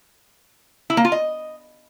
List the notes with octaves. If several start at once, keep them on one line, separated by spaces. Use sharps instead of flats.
E4
A#3
F4
D#5